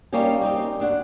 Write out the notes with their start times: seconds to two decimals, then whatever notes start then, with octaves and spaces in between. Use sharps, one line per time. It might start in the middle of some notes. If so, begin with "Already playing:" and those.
0.13 G3 A#3 C#4 D#4 G4
0.41 C4 D#4 G4
0.80 D2 D4 F#5